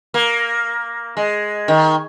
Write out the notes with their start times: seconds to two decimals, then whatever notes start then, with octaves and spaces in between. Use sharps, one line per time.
0.14 A#3
1.17 G#3
1.68 D#3